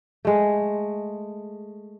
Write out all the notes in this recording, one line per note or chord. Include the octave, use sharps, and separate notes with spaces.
G#3 A3